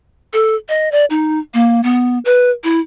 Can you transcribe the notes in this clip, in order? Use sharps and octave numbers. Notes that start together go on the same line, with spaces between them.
A4
D#5
D5
D#4
A#3
B3
B4
E4